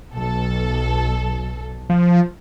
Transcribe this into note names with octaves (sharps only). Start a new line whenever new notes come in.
B1 A4
F3